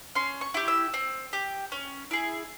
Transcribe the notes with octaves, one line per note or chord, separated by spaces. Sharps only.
C#4 C6
C#6
E4 G4
E6
C4
G4
C#4
E4 G#4